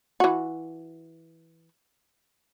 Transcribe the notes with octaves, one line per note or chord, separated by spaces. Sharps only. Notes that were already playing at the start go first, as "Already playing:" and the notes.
E3 F#4